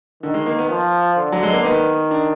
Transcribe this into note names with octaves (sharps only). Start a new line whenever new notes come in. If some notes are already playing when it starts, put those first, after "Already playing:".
D3 D#3
G#3
A#3
B3
F3
D3
F#3
G#3
A#3
D#3 B3
D4